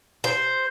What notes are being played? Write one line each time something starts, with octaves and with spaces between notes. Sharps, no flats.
C5